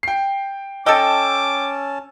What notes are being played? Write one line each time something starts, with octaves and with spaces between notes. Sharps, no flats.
G5 C7
C#4 A4 D#5 G5 A5 D6 E6